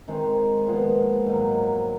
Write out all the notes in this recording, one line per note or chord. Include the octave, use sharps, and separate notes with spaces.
D#3 G#3 C4
A#2 F3 G#3 B3
G#2 D#3 F#3